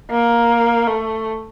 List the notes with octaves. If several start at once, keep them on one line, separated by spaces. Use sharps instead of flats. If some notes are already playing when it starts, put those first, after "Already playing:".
A#3
A3